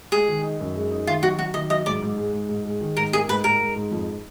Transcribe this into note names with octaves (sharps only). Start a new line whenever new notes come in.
G#3 G#4
D#3
D#4
F#2
G#3
D#4
D#3 F4
F#3 F#4
F#3 F#4
D#3 D#5
F#3 D#5
G#2 D5
G#2
G#3
G#2
G#2
G#3
D#3
G#2 A#4
A#3 G#4
G#2 B4
G#2 A#4
G#2
G#2
F2